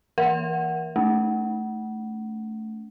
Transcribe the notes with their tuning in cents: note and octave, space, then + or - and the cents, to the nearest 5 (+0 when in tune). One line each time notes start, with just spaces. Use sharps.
E3 +0 A#4 +25 F#5 +10
A3 -5 C#4 +40